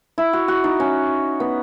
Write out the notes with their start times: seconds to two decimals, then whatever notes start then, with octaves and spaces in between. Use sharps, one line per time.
0.18 E4
0.33 F#4
0.48 F#4
0.64 D#4
0.80 C#4
1.40 B3